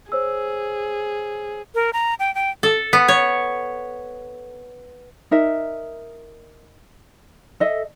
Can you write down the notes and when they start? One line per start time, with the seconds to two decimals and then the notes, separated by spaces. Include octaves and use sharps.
0.12 G#4 C5 C#5 E6
1.75 A#4
1.93 A#5
2.19 G5
2.35 G5
2.63 A4
2.93 B3
3.08 C#5
5.31 D#4 A#4 E5
7.60 A4 D#5 E5